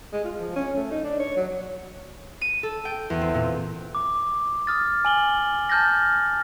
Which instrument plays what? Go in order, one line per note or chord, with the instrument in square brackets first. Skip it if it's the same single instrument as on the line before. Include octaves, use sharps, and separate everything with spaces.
[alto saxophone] G#3
F4
F3
C#4
A3
D#4
D4
C#5
F#3
[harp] D#7
A4
G5
E2
C4
A#2
[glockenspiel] D6
D#6 F6 A6
G#5 F#7 G7
A5 F6 G6 A6 A#6